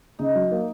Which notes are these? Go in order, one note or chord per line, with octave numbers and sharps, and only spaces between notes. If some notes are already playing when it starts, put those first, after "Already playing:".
C#3 D#4
F#3
A#3